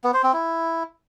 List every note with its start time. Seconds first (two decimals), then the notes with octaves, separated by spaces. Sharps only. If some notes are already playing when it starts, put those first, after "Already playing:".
0.04 B3
0.14 C5
0.23 C4
0.33 E4